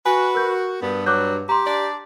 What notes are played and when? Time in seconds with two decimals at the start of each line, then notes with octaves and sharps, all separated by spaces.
0.06 F#4 B4 G#5
0.35 A#4 G6
0.82 G2 B3
1.06 F#3 D6 F#6 G6
1.49 G4 A#5 C6
1.65 D4 D5